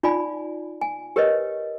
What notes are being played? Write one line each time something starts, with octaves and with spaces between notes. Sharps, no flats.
D#4 F4 D5 G#5 B5
G#5
G4 A#4 B4 C#5 D#5